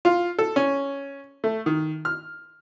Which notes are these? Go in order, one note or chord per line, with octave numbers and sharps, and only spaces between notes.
F4
A4
C#4
A3
D#3
F6